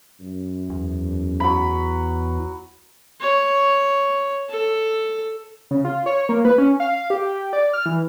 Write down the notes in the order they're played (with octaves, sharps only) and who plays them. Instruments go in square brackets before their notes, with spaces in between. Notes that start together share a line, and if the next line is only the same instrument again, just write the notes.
[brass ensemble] F#2
[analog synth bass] E2
[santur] F#3 B5
[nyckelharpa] C#5
A4
[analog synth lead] C#3
F4
C#5
A#3
B4
C#4
F5
G4
D5
F6
E3